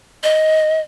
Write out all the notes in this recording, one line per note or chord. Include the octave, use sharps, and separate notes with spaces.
D#5